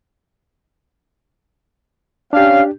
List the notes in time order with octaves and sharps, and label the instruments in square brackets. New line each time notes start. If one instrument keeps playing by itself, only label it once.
[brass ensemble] C#4 F5 [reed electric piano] D4 G4